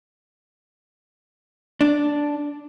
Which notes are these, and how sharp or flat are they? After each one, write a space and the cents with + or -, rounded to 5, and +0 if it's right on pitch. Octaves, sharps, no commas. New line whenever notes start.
D4 -5